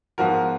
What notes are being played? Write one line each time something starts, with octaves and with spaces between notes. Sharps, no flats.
G#2 F3 B3 F#4 A#4